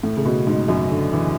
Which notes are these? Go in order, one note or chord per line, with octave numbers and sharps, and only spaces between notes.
A2
C#3
B2
G#2
F#2
D3
E3